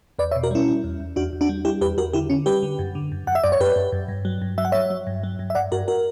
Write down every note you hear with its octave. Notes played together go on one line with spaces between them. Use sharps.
E2 B4 D5
C#5 E5
B2
F#4 A#4
G3 C#4 E4
G3
E2
E2
E2 D4 F#4
E2
D4 F#4
G3
G3 E4 G4
E2 G4 B4
E2 F#4 A#4
D3 E4 G4
D3 C#4
G3 G4 B4
D3
F#2
D3
F#2
F#2 F#5
E5
F#2 D5
C#5
F#2 G4 B4
F#2
F#2
G2
F#3
G2
F#3 E5
F#5
F#3 C#5 E5
F#3
G2
F#3
G2
E5
G2 D5 F#5
G2 F#4 A#4
F#4 A#4